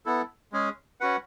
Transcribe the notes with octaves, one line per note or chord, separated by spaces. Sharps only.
B3 E4 A4
G#3 C#4 G#4
C#4 F#4 B4 F#5